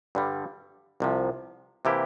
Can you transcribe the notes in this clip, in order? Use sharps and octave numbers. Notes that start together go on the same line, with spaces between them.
G2 D3 G3
C2 C3 F3
C3 E3 A#3 E4 G4